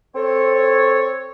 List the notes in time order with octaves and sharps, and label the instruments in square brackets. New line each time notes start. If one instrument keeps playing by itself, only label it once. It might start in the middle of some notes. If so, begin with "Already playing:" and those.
[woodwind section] C4 A4 C#5